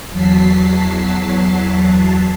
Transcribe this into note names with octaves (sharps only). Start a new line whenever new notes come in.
E2 F#3 A5 B6 C7